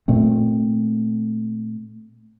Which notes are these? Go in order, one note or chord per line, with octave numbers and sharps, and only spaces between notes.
A#2 A3 C4